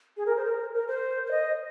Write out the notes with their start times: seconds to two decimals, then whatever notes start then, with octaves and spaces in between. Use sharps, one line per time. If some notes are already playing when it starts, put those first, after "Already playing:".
0.16 G#4
0.26 A#4
0.36 C5
0.45 A#4
0.74 A#4
0.87 C5
1.26 C5
1.30 D#5